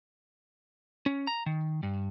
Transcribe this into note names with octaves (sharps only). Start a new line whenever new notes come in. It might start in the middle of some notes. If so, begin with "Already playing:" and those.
C#4
A#5
D#3
G2